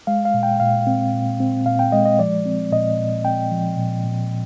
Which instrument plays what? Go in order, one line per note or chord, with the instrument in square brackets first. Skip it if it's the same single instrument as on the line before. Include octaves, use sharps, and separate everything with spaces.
[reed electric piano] G#3 F5
F5
A#2
G5
A#2 F5
C4
A#2
C4
A#2 F5
G5
G#3 D#5
D#5
F3 D5
C4
A#2 D#5
A#2
C4 G5
F3
A#2
A#2